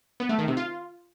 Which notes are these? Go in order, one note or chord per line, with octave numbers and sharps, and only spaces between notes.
B3
A3
D#3
C3
F4